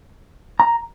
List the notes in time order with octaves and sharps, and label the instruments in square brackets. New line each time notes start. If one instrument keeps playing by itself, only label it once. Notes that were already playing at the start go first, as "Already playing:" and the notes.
[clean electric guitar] A#5